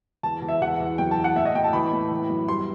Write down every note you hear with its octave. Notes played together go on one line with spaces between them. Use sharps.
E2 A5
E2
E5
E2 F#5
E2
F#2 G5
A5
E3
F#5
A2 E5
D#5
A2 G5
A5
E3 B5
A2
E3
F#2
G2 C6